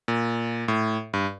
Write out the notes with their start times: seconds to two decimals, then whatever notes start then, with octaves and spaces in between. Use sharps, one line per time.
0.08 A#2
0.68 A2
1.14 G2